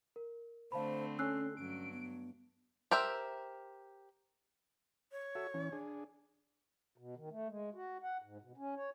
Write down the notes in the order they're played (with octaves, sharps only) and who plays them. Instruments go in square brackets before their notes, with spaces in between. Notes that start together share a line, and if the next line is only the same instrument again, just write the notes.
[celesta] A#4
[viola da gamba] D3 A3 C4 [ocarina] C5 [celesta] F5 A5 B5
[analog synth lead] C#4 [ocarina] A4 [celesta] E6 F#6 C7
[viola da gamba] G2 F#3 [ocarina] C#4 [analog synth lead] D7
[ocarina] B3
[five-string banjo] G4 A#4 C5 E5
[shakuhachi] C#5
[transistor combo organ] F#4 A4 E5
E3 C#4
D4 G#4
[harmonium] B2
D#3
A3
G#3
F#4
F#5
G#2
B2
C#4
C#5